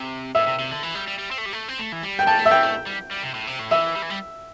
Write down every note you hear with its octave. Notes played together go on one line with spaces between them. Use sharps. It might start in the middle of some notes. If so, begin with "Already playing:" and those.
Already playing: C3
A2 E5
C3
C3
D3
E3
G3
G3
G3
C4
A3
G3
A3
C4
A3
E3
G3
G5
G3 A5
A3
E5
E3 G5
A3
G3
G3
C3
A2
C3
A2
E3 E5
G3
E3
G3